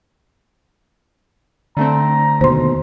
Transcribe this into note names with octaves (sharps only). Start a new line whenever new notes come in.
D3 A3 C4 A#5
D#2 B2 C5 C6